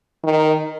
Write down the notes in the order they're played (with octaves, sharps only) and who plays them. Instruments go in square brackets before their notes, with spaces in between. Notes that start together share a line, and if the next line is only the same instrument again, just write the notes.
[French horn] D#3